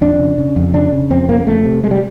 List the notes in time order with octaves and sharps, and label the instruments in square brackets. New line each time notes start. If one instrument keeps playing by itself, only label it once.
[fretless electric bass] F2 D4
C#3
C#3
F2
C#3 D4
C#3
F2 C4
C#3 A#3
A#3
F2 A3
C3
C3 G#3
G3